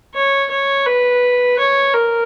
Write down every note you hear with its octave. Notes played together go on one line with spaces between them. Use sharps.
C#5
C#5
B4
C#5
A#4